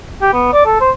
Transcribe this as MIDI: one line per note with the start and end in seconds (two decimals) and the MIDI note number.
0.22 0.32 67
0.33 0.52 59
0.53 0.65 74
0.66 0.81 69
0.81 0.91 72